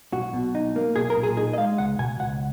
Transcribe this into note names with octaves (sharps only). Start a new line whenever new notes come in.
B1 F#4
B2
D#4
A#3
B1 G#4
A#4
A#2
G#4
D#4 G#4
D#5
G#3 F5
C#2 F#5
B2 G#5
C#2 F#5